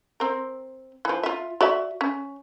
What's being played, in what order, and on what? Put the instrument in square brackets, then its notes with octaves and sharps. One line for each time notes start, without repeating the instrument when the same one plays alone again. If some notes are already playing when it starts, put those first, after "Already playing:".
[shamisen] C4 A#4
E3 F3
F4 E5
F#4 D5 E5
C#4